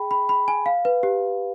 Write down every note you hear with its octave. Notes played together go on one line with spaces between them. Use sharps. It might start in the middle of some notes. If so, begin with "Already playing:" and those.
Already playing: G#4 G5 B5
B5
B5
G#5
F5
B4
G4